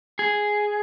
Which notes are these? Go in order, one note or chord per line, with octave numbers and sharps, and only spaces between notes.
G#4